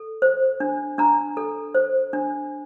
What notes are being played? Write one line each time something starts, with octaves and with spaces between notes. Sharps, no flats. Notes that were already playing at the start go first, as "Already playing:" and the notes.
Already playing: A4
C5
D4
D4 A#5
A4
C5
D4